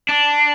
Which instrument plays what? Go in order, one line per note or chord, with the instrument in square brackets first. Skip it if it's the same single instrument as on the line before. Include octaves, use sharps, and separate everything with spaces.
[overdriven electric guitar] D4